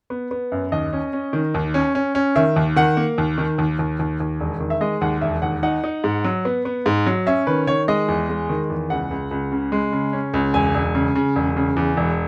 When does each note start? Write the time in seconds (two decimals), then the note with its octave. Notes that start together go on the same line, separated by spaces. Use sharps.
0.10 B3
0.31 B3
0.52 F#2
0.72 D#2 D#5
0.93 C#4
1.13 C#4
1.33 D#3
1.54 D#2
1.74 C#4
1.95 C#4
2.15 C#4
2.36 D#3 E5
2.56 D#2
2.76 D#3 F#5
2.97 A#3
3.18 D#2
3.38 D#3
3.58 D#2
3.79 D#2
3.99 D#2
4.20 D#2
4.40 E1
4.60 D#3
4.70 E5
4.81 G#3 D#5
5.01 D#2 F#5
5.21 E1 E5
5.42 D#2 F#5
5.63 D#4 F#5
5.84 D#4
6.04 G#2
6.24 F#3
6.45 B3
6.65 B3
6.86 G#2
7.06 F#3
7.27 C#4 E5
7.47 D#3 B4
7.67 D#3 C#5
7.88 G#3 D#5
8.08 E2
8.29 G#3
8.49 D#3
8.70 E2
8.90 C#2 F#5
9.11 C#2
9.31 C#2
9.52 C#3
9.72 G#3
9.92 C#3
10.13 C#4
10.34 C#2
10.54 E1 G#5
10.74 E1
10.95 C#3
11.15 C#3
11.36 E1
11.57 C#3
11.76 E2
11.97 E1